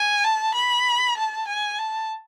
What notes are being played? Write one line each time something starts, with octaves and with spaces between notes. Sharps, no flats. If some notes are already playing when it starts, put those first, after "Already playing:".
Already playing: G#5
A5
B5
A5
G#5
A5